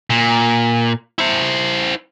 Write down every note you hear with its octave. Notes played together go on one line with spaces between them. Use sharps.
A#2
E4 C5